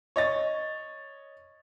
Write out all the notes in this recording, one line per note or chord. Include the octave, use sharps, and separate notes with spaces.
C#5 D#5 C#6 A6